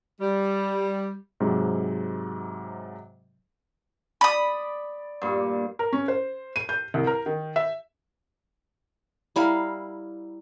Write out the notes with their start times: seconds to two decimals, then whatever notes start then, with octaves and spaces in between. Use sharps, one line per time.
0.21 G3
1.40 G#2 C3 F#3 G#3
4.21 D5 B5 D#6
5.22 G2 A#2
5.79 A#4
5.93 C#4
6.08 C5
6.56 D#7
6.69 G6
6.94 C2
7.07 A#4
7.26 D#3
7.56 E5
9.36 G3 E4 A#4 F5